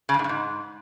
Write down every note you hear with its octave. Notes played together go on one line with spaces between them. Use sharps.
C#3
G2
G#2
G2
G#2